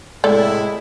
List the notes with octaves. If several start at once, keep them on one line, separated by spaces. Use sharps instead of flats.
A2 C3 G#3 E4 A4 D5